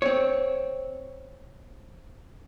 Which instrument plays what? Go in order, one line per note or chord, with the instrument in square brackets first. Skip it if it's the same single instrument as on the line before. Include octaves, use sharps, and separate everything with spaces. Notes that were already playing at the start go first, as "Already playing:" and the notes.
[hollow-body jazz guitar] C4 C#5